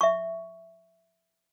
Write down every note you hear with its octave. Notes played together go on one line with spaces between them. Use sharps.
E5 C#6